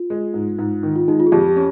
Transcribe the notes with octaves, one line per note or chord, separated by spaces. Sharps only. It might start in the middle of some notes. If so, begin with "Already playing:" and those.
Already playing: F4
G#3
G#2
G#2
D#3
F4
G#3 D#4
F4
G#4
F2 G4
G4
C#4